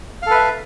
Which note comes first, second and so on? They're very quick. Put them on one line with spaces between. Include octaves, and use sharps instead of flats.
F5 A4 B4 E5